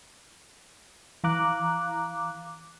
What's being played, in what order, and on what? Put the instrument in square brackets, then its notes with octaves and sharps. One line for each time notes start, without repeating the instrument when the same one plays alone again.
[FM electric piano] E3 F5 A#5 D6 F#6